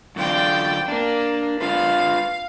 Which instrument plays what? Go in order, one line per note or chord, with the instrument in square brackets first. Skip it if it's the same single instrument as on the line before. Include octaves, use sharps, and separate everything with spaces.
[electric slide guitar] F#2 D3 F4 [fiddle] D5 G5
[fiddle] A#3 [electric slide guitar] D4
[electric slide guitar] D4 F4 B4 [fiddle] F5